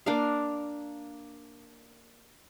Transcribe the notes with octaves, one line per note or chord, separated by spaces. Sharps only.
A#3 D4 A#4 F5